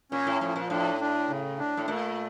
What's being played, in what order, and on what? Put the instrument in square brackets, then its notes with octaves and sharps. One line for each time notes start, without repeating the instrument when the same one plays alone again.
[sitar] A#2 [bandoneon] C#4
[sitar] A2
[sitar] A2 [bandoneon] F3
[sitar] A#2
[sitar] A2 [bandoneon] D4
[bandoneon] D4
C#3
D4
[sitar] A2
[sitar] A#2 [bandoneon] A3